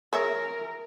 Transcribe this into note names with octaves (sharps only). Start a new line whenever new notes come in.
G#4 A#4 C#5 E5